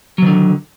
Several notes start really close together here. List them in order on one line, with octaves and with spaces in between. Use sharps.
F#3 D#3 D3